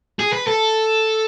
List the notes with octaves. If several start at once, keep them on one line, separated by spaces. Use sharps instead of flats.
G#4
B4
A4